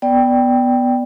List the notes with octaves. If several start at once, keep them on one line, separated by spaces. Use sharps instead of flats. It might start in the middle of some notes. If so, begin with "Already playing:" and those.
B3 D5 G5